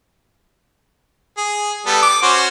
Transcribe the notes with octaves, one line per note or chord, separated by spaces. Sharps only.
G#4
G3 B3 A4
D6
C#4 F#4 C5